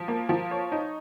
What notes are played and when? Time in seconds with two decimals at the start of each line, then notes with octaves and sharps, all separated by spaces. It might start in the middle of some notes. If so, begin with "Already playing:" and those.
Already playing: F3
0.08 A#3
0.29 F3
0.51 C#5
0.72 D#4